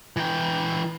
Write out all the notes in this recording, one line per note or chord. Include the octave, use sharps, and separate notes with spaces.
E3 G5